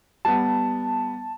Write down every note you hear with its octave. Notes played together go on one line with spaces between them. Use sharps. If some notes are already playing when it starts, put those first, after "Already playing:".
G3 B3 A5